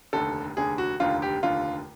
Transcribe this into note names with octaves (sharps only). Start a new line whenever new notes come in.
F1 D#2 D3 A4
F1 D#2 D3 G#4
F#4
F1 D#2 D3 F4
G4
F1 D#2 D3 F4